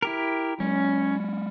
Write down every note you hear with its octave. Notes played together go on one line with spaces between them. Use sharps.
E4 G4 A#4
F#3 G#3 C#4